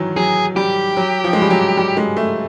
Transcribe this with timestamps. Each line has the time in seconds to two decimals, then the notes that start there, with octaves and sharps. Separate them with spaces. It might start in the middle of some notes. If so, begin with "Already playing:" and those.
Already playing: D#3 E3 F#3
0.16 F#3 G#4
0.56 G3 G4
0.97 F#3
1.24 F3
1.33 G#3
1.42 G3
1.50 F#3
1.77 G3
1.97 G#3
2.17 A3